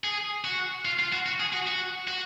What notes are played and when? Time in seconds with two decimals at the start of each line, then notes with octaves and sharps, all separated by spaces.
0.04 G#4
0.44 F#4
0.85 F4
0.99 F4
1.12 F#4
1.26 F#4
1.40 G#4
1.53 F#4
1.67 F#4
2.08 F#4